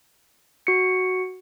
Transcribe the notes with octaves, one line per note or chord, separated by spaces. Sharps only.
F#4 C#7